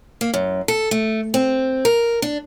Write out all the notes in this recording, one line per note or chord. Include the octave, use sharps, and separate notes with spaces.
A#3
F#2
A4
A3
C4
A#4
D4